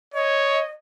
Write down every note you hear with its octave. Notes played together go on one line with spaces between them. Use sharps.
C#5 D#5